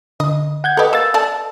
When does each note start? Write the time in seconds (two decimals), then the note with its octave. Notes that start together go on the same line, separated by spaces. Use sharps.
0.20 D3 D#5
0.64 F#5 G6 G#6
0.77 G4 A4 B4 D#5 F#5
0.93 A#3 E6 A6
1.14 A4 D5 A5